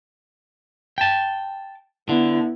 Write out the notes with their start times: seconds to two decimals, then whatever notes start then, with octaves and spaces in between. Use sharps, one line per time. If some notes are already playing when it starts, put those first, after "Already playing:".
0.98 G5 A5
2.09 D3 B3 E4